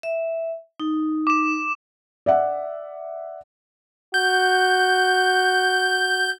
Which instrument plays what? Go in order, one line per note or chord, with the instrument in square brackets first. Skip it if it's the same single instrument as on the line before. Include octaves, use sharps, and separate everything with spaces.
[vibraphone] E5
D#4
[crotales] D6 E7
[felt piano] D5 E5 F#5
[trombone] F#4 [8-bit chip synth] G6